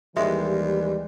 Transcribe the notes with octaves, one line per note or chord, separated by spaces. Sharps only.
D#2 E3 G3 G#3 E5